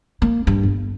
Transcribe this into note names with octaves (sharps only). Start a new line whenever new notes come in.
A#3
G2
G1